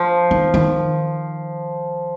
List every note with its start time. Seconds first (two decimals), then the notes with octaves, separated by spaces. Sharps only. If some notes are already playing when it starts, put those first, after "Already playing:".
Already playing: F3
0.31 D#3
0.54 D#3